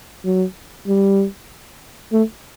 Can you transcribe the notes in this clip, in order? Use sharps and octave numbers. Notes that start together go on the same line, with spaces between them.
F#3
G3
A3